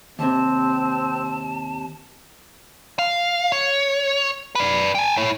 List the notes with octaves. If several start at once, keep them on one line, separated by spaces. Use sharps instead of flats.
D#2 C3 C4 A5
F5
C#5
B4 D5
G5 G#5
E4 C#5